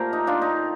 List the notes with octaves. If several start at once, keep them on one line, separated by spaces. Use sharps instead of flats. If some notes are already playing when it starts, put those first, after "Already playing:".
Already playing: A#2 A3 G4 A#4 C5
D#4
D4 F4
D#4